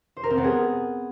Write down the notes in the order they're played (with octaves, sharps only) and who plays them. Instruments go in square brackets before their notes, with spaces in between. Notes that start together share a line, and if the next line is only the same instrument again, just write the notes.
[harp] C5
A#4
C4
B3
G#4